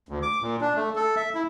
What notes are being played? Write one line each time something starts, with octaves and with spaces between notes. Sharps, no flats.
D2
D6
A#2
D4
A3
A4
E5
E4